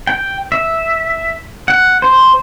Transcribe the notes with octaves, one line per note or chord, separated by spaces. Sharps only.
G5
E5
F#5
C5